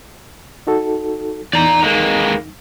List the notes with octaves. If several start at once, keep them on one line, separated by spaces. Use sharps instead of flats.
D#4 F#4 A4
E2 D#4 D5 A#5 G6
D#3 G#3 A#3